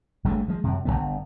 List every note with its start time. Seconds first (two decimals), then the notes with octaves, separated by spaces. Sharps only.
0.24 G1 D3 G#3 A3
0.48 F3 G#3
0.64 F#2 C3
0.85 G1 F#2 D3 B3